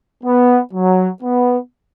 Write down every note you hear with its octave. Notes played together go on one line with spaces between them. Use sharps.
B3
F#3
B3